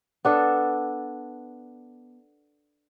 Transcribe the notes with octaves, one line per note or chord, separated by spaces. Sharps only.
B3 D4 A4